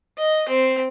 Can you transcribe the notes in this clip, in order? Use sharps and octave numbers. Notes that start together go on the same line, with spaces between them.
D#5
C4